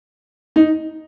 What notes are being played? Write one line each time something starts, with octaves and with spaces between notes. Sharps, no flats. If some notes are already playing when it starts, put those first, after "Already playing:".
D#4